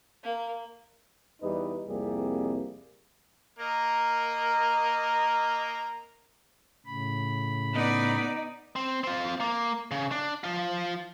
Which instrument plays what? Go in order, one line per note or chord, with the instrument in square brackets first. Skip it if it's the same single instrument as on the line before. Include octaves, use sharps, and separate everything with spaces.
[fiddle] A#3
[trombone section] E2 G3 D#4 B4
C2 F2 G3 A#3 G#4
[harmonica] A#3 A#4 D#5
[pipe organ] A2 C#3 B5
[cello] B3 D5 [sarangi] D#4
[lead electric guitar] C4
C4 F4
A#3
C#3
D4
F3 F4